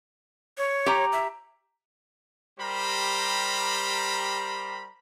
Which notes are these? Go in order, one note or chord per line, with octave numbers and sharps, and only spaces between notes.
C#5
G4 A#5
E5
G3 G4 A#4 C5 A#5 B5